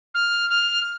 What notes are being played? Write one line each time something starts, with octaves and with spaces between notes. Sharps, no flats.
F6
F6